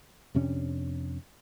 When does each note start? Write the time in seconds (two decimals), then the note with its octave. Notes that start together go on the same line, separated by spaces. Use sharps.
0.35 F2 C3 C#4 D4